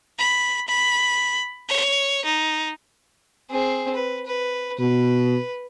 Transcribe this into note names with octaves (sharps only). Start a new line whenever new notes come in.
B5
B5
C#5
D#4
C4 G#4
B4
B4
B2 B4